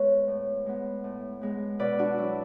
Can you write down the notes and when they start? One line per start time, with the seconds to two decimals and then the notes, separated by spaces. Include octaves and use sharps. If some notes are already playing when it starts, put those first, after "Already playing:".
Already playing: G#3 B3 B4 C#5
0.28 A2
0.66 G#3 B3
1.04 A2
1.41 G#3 B3
1.79 B2 B4 D5
1.98 D4 F#4
2.18 F#3 B3 E4